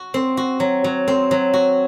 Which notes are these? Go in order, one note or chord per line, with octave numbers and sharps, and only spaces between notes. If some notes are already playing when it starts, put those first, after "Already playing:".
Already playing: F#4
C4
F#4
F#3
F#3
C4
F#3
F#4